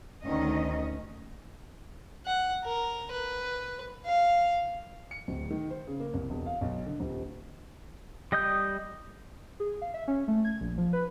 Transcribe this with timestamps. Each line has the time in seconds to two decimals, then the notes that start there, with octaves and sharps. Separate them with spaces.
0.25 D2 D#3 C#4 D#5
2.26 F#5
2.64 A#4
3.12 B4
4.06 F5
5.11 C#7
5.28 D1
5.50 D#3
5.70 C5
5.87 C#3
6.00 A#3
6.14 C2
6.30 E1
6.46 F5
6.61 B1
6.86 D3
7.00 D#1
8.32 G3 D#5 D#6 G6
9.60 G#4
9.82 F5
9.94 E5
10.08 C#4
10.28 A3
10.45 G#6
10.61 A#1
10.78 F3
10.93 B4